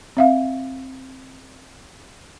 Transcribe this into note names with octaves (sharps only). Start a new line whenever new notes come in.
C4 E5 F5